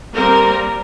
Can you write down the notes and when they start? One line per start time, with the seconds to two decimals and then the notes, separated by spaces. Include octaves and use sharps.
0.14 G3 A#3 C4 A#4